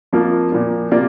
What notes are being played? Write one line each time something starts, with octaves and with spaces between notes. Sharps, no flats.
F2 F3 A#3 F4
A#2 F3 A#3
C3 A#3 F4 D5